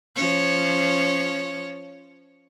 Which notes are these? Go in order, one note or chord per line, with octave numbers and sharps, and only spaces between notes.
F3 C#4 C#5